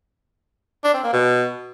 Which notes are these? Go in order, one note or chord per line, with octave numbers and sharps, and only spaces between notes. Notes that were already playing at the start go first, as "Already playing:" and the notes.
D4
C4
A#3
B2